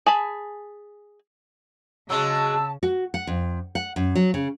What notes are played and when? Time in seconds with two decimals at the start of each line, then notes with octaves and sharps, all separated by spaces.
0.06 G#4 A5 B5
2.10 C#3 F#3 G#3 A5 E6
2.83 F#4
3.14 F#5
3.27 F2
3.75 F#5
3.96 F#2
4.15 F#3
4.34 C#3